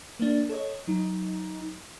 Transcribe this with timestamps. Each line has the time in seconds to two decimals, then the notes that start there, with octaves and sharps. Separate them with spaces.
0.19 A#3 D4
0.49 A4 C#5 D#5
0.87 F#3 D#4